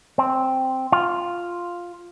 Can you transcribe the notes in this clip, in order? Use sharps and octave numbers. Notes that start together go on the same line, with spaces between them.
C4
F4